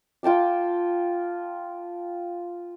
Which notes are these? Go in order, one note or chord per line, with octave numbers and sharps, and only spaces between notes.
F4 G5 A5 D6